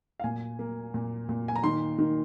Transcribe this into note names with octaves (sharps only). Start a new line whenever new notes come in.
F5
A#2 G#5
A#3
A#2
A#2
G#5
A#5
D#3 C6
D#3